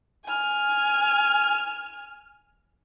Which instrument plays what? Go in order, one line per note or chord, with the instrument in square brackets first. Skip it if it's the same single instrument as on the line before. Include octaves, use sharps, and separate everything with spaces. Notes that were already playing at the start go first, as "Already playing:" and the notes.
[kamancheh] G#5 F6